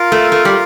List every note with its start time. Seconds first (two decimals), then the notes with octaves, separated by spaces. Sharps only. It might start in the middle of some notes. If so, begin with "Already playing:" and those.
Already playing: F4 A#4 F5
0.12 A3
0.32 A3
0.45 G3